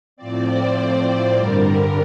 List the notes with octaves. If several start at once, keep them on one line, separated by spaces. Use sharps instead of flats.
A2 F3 C4 D5
C5
C5
G2 D3 G3 A#4